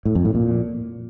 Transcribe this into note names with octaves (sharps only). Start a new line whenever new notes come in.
A2
F2
A2
A#2